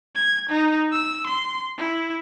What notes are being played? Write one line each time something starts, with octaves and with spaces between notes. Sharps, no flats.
G#6
D#4
E6
C6
E4